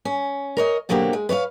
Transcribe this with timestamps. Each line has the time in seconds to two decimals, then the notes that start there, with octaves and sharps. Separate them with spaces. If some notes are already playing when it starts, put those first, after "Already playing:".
0.05 C#4
0.57 A#4 C#5 D#5
0.89 B2 D3 F#3 A#3 C4 G4
1.13 G#3
1.29 B4 C#5 D#5 F5